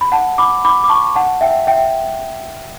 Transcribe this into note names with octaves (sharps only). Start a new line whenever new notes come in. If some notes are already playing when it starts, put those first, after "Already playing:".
B5
F#5 A5
B5 D6
B5 D6
D6
A5 C#6
F#5 A5
E5 G5
E5 G5